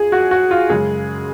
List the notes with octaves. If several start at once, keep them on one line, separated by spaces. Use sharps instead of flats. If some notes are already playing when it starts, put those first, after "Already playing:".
Already playing: F2 F3 G#4
F#4
F#4
F4
F#2 C#3 G#3 G#4